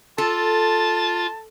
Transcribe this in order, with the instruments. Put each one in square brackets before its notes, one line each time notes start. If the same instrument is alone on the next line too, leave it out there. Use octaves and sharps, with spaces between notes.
[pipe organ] F4 [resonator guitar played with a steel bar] A4 [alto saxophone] A5